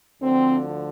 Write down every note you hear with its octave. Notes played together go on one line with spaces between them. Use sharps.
D2 D3 F3 C4